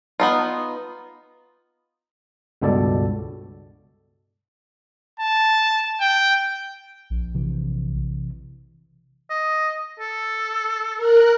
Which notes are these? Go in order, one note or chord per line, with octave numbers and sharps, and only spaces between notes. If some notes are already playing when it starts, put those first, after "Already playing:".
B3 D#4 F4
C#2 G2 B2 G#3 A4 D5
A5
G5
A#1
C3 E3
D#5
A4
A#4 F#6